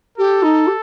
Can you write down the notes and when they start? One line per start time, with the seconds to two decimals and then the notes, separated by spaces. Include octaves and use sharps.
0.18 G4 A4
0.42 D#4
0.67 G4